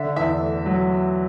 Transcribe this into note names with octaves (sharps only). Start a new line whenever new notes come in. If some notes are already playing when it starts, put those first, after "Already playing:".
Already playing: D3 E5
E2 E5
A3
F#3